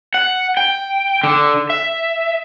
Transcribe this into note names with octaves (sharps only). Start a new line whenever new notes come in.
F#5
G5
D3
E5